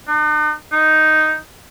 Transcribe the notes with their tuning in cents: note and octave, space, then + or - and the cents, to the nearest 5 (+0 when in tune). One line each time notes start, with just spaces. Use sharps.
D#4 -45
D#4 +0